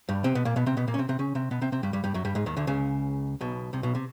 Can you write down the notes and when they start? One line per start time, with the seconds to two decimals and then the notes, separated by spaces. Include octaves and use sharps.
0.09 G2 G3
0.24 C3 C4
0.35 B2 B3
0.45 A#2 A#3
0.56 B2 B3
0.66 C3 C4
0.77 B2 B3
0.88 A#2 A#3
0.94 C#4
0.98 C3 C4
1.09 C3 C4
1.19 C#3 C#4
1.35 C3 C4
1.51 B2 B3
1.61 C3 C4
1.72 C3 C4
1.83 G2 G3
1.93 G2 G3
2.04 G2 G3
2.14 F#2 F#3
2.25 G2 G3
2.35 G#2 G#3
2.46 D#2 D#3
2.57 D2 D3
2.67 C#2 C#3
3.41 B1 B2
3.73 C2 C3
3.83 B1 B2
3.95 C3